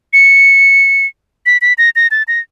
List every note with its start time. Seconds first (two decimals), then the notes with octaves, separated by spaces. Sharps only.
0.13 C#7
1.46 B6
1.62 B6
1.78 A#6
1.96 A#6
2.11 A6
2.28 A#6